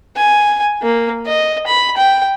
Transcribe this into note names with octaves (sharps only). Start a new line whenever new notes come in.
G#5
A#3
D#5
B5
G5